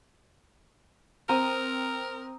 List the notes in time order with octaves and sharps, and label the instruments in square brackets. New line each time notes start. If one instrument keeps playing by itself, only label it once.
[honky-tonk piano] C4 [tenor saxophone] A#4 [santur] A#5 D#6